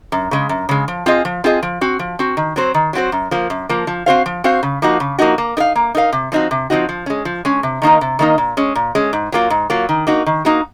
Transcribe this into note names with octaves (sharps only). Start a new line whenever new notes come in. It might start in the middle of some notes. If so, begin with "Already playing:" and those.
F#2
C#3 G#3
F#2
C#3 G#3
F3
C4 F4 G#4 D#5
F3
C4 F4 G#4 D#5
F3
C4 F#4
F3
C4 F#4
D#3
F#3 C4 F#4 C5
D#3
F#3 C4 F#4 C5
F#2
F3 A#3
F#2
F3 A#3
F3
C4 F#4 C5 F5
F3
C4 F#4 C5 F5
C#3
F3 A#3 D#4 F#4
C#3
F3 A#3 D#4 F#4
A#3
D#4 A#4 F5
A#3
D#4 A#4 F5
C3
F3 C4 D#4 F#4
C3
F3 C4 D#4 F#4
F3
G#3 C#4
F3
G#3 C#4
C3
D#3 A#3 D#4 A#4
C3
D#3 A#3 D#4 A#4
A#2
G#3 C#4
A#2
G#3 C#4
G#2
F#3 A#3 F4
G#2
F#3 A#3 F4
D#3
A#3 D#4 F#4
D#3
A#3 D#4 F#4